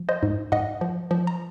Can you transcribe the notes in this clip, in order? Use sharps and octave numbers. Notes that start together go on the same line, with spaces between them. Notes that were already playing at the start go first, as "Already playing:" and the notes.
Already playing: F3
C5 D#5
G#2
G#2 D#5 F#5
F3
F3
A#5